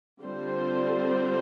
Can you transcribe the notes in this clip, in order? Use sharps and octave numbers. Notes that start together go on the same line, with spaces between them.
D3 G3 C4 F4 C5